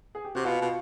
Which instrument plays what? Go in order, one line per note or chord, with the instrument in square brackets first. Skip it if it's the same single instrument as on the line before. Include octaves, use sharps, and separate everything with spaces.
[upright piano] G#4
G4
[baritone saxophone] C3 [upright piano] F#4
[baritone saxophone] B2 [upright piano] F4
[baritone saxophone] B2 [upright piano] F#4